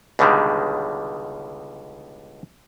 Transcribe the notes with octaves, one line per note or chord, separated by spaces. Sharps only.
C#2 B2 D3 D#3 G3 G#3